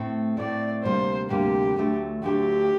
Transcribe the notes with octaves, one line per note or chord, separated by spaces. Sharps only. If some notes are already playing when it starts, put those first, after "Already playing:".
Already playing: A2 A3 C4
A2 A3 C4 D5
D2 C3 G3 A#3 C5
D2 C3 G3 A#3 G4
D2 D3 F#3 A3
D2 D3 F#3 A3 G4